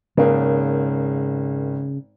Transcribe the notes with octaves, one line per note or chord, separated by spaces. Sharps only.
G#1 C#3 A#3